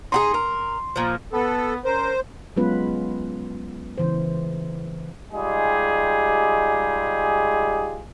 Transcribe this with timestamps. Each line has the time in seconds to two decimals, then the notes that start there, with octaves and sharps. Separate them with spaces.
0.12 D#4 F#4 G#4 C6
0.34 A#4
0.96 A#2 F3
1.33 B3 A4
1.85 C#4 A#4 C5
2.56 F#3 G#3 B3 C#4 F4 B4
3.98 C#3 E3 C5
5.33 G3 G#3 D#4 F4 G4 G#4